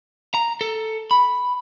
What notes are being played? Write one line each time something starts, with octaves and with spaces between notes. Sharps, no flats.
A#5
A4
B5